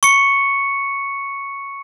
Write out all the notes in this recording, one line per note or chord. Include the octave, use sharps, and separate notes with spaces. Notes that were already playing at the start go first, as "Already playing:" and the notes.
C#6 C#7